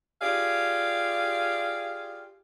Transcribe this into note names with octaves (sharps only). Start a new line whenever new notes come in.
F4 G4 G#4 D5 F5